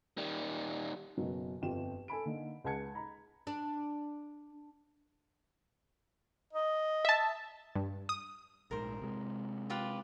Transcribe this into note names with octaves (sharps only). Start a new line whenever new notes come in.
D#3 G3
F#1 B2 F#3
G1 F2 F4 G4 G5 E7
A4 G#5 B5 D7
D3 A#3 D#4
C#2 G#4 F#5 A5 G#6 C#7
A#5 B5
D4
D#5
E5 A5
G2
D#6
A#1 G#2 A#4 C5
C3 G#3
F4 G4 B4